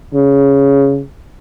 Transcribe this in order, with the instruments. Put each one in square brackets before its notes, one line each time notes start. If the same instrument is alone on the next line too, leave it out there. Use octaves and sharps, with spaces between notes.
[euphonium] C#3